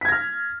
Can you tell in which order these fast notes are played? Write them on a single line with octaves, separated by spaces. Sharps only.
B6 G#6 A#6 F6